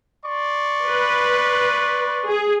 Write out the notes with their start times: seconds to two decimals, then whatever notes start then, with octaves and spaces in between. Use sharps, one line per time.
0.24 D5 C6 C#6
0.85 B4
2.27 G#4